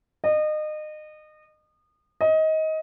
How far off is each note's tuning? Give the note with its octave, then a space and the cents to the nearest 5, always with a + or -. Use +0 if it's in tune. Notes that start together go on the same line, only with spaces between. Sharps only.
D#5 -30
D#5 +20